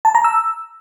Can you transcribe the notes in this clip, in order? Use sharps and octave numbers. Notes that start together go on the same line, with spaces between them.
A5
A#5
E6